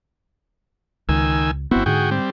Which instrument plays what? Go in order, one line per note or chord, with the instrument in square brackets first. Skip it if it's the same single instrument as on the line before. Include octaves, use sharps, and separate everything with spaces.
[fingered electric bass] C#2 [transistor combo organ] D#3 G#5 E6
[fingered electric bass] G1 B3 [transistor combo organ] C4 E4 F#4
[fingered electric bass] G#2 D3 [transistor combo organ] F#4 G#4 G5
[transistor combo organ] G3 C4